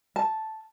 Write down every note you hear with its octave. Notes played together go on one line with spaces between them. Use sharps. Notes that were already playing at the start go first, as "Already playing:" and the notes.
A5